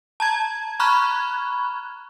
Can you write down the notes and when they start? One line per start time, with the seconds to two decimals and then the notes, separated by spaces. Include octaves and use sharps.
0.20 A5 A#5 G#6
0.80 A#5 B5 C#6 F6 F#6 G#6